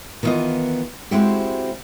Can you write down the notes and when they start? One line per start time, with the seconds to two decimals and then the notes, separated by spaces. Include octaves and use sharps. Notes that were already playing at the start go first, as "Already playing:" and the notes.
0.23 D#3 E3 G3 B3 F4 D#5
1.11 G#3 C4 E4 F#4 G4